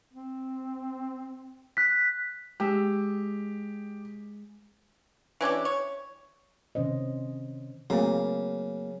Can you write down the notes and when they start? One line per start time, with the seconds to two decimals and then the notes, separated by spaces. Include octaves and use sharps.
0.13 C4
1.77 F#6 B6
2.60 G#3 G4 E6
5.41 E3 C#4 D4 G4
5.65 C#5
6.75 C3 D#3 C#4 C5 D#5
7.90 C#3 F#3 A3 A#3 C4